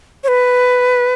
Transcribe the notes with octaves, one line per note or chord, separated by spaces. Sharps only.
C#5
B4